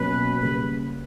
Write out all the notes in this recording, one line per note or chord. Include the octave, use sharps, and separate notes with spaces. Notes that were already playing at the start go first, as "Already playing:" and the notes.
Already playing: B2 F#3 A#3 C#4 B4
C#3 G3 A#3 B4